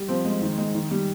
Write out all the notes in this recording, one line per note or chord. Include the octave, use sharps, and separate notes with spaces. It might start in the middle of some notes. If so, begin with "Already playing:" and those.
Already playing: G3
F3 C4
G#3
D#3
G#3
D#3
G3